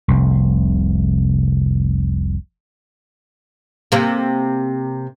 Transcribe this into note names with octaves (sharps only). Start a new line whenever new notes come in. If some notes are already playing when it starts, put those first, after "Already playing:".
F1 C2
C3 A#3